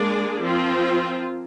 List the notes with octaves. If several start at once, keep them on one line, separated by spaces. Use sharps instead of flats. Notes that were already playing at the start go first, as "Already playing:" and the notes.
Already playing: G#3 A#3 D4 G#4 D5
F3 C4 F4